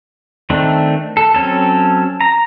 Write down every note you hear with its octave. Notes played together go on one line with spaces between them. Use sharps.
D#3 A3 C4 D4
A4
F#3 C4 C#4 A4
A#5